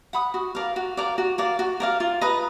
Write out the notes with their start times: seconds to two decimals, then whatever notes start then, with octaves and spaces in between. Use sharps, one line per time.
0.13 F#5 B5 D#6
0.34 F#4
0.55 A#4 D5 F5
0.76 F#4
0.97 A#4 D5 F5
1.18 F#4
1.38 A#4 D5 F5
1.59 F#4
1.80 A#4 D5 F5
2.00 F4
2.21 B4 D#5 A#5